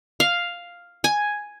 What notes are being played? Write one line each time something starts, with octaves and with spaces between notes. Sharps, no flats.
F5
G#5